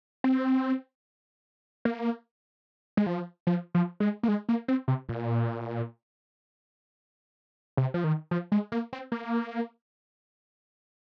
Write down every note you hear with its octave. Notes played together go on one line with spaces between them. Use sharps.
C4
A#3
G#3
F3
F3
F3
G#3
A#3
G#3
A#3
C4
C3
A#2
C3
F3
D#3
F3
G#3
A#3
C4
A#3